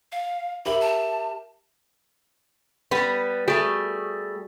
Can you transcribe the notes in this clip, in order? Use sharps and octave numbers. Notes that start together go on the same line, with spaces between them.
F5
G4 A#4 E5 B5
A5
G3 B3 B4
G3 A3 F#4 G#4